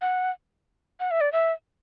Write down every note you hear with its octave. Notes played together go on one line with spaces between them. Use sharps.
F#5
F#5
E5
D5
E5